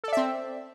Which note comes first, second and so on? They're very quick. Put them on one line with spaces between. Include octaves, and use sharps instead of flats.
A4 D5 E5 C4